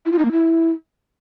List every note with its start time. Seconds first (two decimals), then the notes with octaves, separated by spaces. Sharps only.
0.06 E4
0.12 F4
0.19 D#4
0.25 A#3
0.32 E4